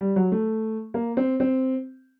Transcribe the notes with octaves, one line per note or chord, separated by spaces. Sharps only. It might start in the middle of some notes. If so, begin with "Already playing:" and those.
G3
F#3
A3
A#3
C4
C4